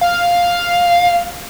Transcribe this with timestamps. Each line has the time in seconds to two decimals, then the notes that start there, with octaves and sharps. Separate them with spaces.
0.01 F5